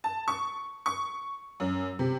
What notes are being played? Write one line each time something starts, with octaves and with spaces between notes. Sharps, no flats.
A5
C#6
C#6
F#2
C3